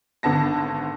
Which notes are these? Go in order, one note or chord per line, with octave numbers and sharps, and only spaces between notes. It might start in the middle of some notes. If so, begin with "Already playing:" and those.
G#1 D3 B3 A5 A#6